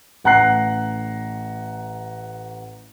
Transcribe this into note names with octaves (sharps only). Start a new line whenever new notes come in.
A1 F#5 A#5 F#6 C7